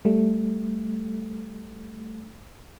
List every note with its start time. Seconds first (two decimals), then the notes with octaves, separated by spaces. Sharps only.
0.05 G3 A3